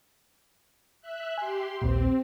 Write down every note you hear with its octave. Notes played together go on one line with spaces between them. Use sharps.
E5 F#6
G4 G#5 C6
A#1 D#2 A#2 C4